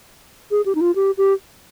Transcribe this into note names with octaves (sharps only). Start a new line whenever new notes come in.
G#4
G4
D#4
F4
G4
G4